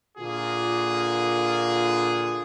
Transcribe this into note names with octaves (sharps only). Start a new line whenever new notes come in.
A#2 D3 A#3 F4 F#4 G#4